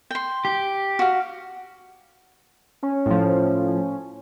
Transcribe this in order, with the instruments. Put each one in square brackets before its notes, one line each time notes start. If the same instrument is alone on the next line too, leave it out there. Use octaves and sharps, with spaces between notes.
[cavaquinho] G5 C6
[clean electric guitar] G4
[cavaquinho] F#4 F5
[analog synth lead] C#4
[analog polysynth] A2 F3